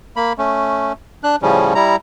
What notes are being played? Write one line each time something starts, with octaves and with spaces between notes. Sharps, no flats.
A#3 B5
A3 C#4
D4 F#6
A2 C#3 F3 G3 C#4
G3 E4 A#5